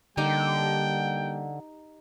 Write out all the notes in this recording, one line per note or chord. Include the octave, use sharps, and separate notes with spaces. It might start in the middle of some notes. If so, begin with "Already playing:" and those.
D3 G3 A#3 D#4 G4 G5